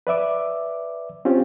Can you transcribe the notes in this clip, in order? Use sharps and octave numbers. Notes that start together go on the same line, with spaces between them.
B4 D5 E5 D6
C4 C#4 F4 G4